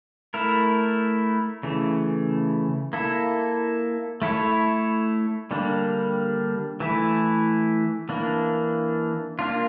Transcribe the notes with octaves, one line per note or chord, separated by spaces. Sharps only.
A3 E4 A#4
C#3 E3 A3
A#3 E4 A4
A3 E4 A4 C#5
D3 G3 A#3 D4
E3 A3 E4
E3 A#3 D4
A#3 D4 F4